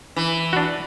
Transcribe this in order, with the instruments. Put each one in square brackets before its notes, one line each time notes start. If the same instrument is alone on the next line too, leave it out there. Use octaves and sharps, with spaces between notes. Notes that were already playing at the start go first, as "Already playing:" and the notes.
[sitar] E3
[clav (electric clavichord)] D4 F#4